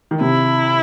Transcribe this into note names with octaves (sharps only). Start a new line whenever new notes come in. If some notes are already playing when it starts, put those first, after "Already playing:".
D#3
C3 E4